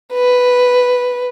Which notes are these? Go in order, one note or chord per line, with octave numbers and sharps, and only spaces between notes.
B4